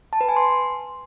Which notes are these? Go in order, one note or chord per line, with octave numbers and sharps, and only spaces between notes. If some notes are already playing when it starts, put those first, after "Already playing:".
A5
B4
G#5
C6